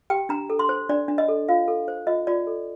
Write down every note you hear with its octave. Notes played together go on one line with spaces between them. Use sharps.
G4 G5
D4 A#5
A4
C6
C5
D4 D5
D4
D#5
A4
F4 F5
A4
C5
F4 D#5
F4 D5
A4